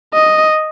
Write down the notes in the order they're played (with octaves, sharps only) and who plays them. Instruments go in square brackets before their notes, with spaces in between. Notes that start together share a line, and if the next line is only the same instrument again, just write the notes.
[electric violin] D#5